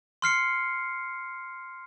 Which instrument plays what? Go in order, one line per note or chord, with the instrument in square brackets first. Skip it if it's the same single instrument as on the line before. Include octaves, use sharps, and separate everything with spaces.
[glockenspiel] C6 F6 C7 C#7